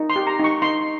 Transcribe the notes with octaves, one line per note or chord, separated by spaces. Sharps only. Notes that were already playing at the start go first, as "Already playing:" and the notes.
Already playing: D#4
C6
G4
A#5
D#4 C#6
D#4 C6